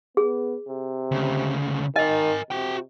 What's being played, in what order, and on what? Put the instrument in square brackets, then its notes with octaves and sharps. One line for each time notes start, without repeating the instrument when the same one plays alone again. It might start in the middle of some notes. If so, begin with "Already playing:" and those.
[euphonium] B3 [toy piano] G#4
[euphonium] C3
[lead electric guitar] D2 C#3
[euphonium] D#3 [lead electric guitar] A#4 G#5 [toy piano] D#5
[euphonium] C3 [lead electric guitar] F#4 G5